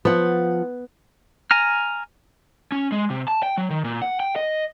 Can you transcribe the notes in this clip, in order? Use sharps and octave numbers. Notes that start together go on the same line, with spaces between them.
F3 B3 F#5
G#5 A#5 F6
C#4
G#3
C3
A5
G5
F#3
D#3
A#2
F#5
G5
D#5